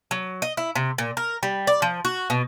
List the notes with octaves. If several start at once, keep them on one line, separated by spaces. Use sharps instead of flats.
F#3
D#5
E4
C3
A#2
A#4
G3
D5
F3
F#4
B2